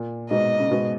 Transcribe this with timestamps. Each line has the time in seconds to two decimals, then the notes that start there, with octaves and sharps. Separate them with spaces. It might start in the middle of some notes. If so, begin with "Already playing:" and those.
Already playing: A#2
0.30 G#2 B2 D#5
0.60 C#3
0.71 G#2 B2